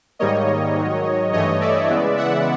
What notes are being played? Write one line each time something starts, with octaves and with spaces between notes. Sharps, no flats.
G#2 D#3 G3 A#3 C#5 D#5
G#2 D#3 F#3
G2 E3 A3 C#5 D#5
D5 E5
C#3 E3 G#3 B3
E5 F#5